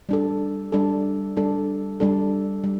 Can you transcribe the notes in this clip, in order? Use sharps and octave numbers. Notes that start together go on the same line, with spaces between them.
G3 D4 A4
G3 D4 A4
G3 D4 A4
G3 D4 A4
G3